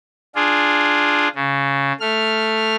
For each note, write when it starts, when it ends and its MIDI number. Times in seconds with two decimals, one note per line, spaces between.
0.35 1.28 62
0.35 1.28 65
0.35 1.28 68
1.35 1.93 49
2.00 2.76 57
2.00 2.76 89